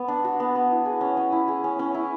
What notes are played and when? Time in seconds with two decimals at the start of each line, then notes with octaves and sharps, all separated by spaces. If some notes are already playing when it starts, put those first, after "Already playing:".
Already playing: B3
0.08 D4
0.24 F#4
0.40 B3
0.55 B3
0.71 E4
0.85 G#4
1.01 C#4
1.17 C#4
1.32 E4
1.48 G#4
1.64 C#4
1.79 C#4
1.94 E4